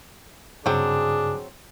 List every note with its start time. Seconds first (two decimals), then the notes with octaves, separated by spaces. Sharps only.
0.66 G2 C#3 F#3 C4 D4 G#4